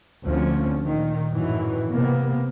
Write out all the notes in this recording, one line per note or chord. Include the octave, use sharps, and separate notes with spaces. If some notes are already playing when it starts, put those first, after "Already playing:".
D2 D3 F3 C4 C#4
A#2 D#3
F#2 A2 D#3 E3 F#3
C3 A#3 B3